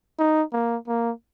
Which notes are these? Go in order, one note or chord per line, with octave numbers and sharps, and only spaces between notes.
D#4
A#3
A#3